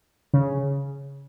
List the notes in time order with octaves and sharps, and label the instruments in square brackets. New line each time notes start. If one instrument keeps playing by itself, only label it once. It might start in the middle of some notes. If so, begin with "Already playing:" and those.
[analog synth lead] C#3